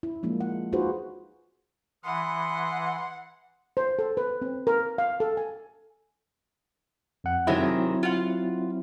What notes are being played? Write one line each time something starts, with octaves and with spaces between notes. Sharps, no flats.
E4
F3 G#3 A#3 D4
F#5
D#4 F4 F#4 G#4 B4 C5
E3 F#5 B5 C6 D#6
C5
A4
B4
C4
A#4
F5
A4
G#5
F2 F#5
C3 D#3 F#3 G#3 C4 E4
F4 F#5